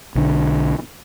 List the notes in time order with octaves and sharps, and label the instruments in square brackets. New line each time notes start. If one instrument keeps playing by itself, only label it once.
[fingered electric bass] B1 D3